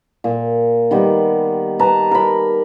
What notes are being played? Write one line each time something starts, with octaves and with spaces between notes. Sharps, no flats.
A#2
D#3 G3 B3
B4 A5 A#5
A#4 B5